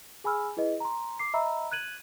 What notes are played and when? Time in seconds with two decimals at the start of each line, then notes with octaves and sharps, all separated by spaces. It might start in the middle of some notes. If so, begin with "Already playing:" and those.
0.24 G#4 G#5 B5 E6 F6
0.57 E4 G#4 B4 D#5
0.80 A#5 C6
1.19 D6 C7
1.34 D#5 E5 A#5 B5 E6
1.72 F#6 G#6 D#7 F#7